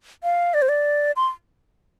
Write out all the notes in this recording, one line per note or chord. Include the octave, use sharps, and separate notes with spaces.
F5
D5
C5
D5
C6